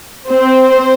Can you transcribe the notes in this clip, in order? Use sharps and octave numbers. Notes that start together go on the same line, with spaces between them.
C4 C5